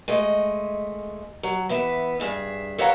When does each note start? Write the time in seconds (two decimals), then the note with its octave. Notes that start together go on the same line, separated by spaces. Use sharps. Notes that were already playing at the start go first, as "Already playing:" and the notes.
0.08 G#3 A3 D#5
1.43 F#3
1.69 E3 B3 E5
2.20 G2 G#4 E5
2.79 A4 B4 C#5 F5 F#5 A#5